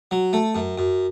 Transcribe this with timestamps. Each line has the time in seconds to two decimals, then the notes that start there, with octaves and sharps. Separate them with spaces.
0.11 F#3
0.33 A3
0.55 F#2
0.78 F#2